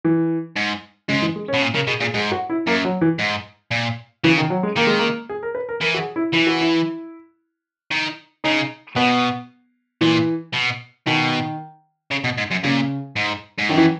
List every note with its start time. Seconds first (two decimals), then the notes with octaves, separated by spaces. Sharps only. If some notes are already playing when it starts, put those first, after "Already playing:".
0.05 E3
0.56 G#2
1.08 G#2 C#3
1.22 E3
1.36 G#3
1.48 C#4
1.54 B2
1.62 A#2
1.74 C#3 A#4
1.87 B2 G#4
2.01 A#2 G#4
2.14 G#2 G#4
2.32 F#4
2.50 E4
2.67 F#2 A#3
2.85 F#3
3.01 E3
3.19 G#2
3.71 A#2
4.24 C#3 E3
4.38 D#3
4.50 F#3
4.63 G#3
4.76 D#3 A#3
4.87 G#3
4.99 A#3
5.29 G#4
5.43 A#4
5.55 B4
5.69 A#4
5.81 E3 A#4
5.94 F#4
5.99 G#4
6.16 E4
6.33 E3 E4
6.47 F#4
6.61 E4
7.91 D#3
8.44 C#3 D#4
8.96 B2 B3
10.01 A#2 E3
10.54 B2
11.06 B2 D#3
12.11 C#3
12.24 B2
12.38 G#2
12.51 F#2
12.63 A#2 C#3
13.16 G#2
13.58 G#2
13.69 F#2 D#3
13.77 E3